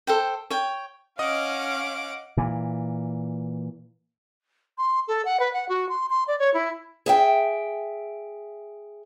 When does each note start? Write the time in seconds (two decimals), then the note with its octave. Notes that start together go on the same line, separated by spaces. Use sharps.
0.07 A4 C5 G5
0.50 C#5 G5
1.19 C#4 D#5 F5 F#5 D6 D#6
2.37 A#2 E3
4.78 C6
5.08 A4
5.25 F#5
5.40 B4
5.53 F#5
5.69 F#4
5.89 C6
6.10 C6
6.28 D5
6.39 C#5
6.54 E4
7.06 G#4 E5 G5